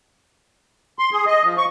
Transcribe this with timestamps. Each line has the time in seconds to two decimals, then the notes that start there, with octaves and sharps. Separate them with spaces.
0.99 C6
1.12 G#4
1.27 D#5
1.44 F3
1.57 C#6